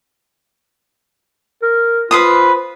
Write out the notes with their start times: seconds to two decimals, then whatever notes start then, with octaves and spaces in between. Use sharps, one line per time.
1.62 A#4
2.11 F4 B4 C5 D#6